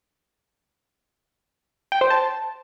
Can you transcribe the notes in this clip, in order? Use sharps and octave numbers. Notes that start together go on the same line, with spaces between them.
G5
C5
A5